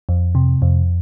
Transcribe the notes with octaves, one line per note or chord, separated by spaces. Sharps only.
F2
C3
F2